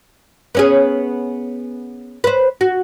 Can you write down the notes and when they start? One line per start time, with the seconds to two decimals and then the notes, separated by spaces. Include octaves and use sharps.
0.55 B3 C#4 G#4
2.24 B4 C5
2.61 F#4